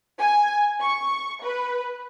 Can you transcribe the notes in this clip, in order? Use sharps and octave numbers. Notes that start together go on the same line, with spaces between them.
G#5
C#6
B4